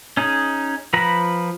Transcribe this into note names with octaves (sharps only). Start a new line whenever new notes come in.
C#4 D#4 G#4
F3 B4 A#5 B5